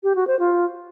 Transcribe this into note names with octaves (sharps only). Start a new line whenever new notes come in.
G4
F#4
C5
F4